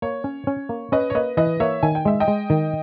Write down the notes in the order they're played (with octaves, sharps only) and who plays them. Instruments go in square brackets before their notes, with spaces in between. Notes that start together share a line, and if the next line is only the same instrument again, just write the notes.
[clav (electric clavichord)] A#3 [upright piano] C#5
[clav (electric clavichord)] C#4
C#4
A#3
[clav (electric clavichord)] C#4 [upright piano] B4 D#5
[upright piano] C#5
[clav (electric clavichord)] A#3 [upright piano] B4 D#5
[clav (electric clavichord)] E3 [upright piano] B4 D#5
[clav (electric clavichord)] A#3 [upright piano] C#5 E5
[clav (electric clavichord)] D#3 [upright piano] G#5
[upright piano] G5
[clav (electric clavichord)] G#3 [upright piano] E5
[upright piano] D#5 G5
[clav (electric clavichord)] G#3
D#3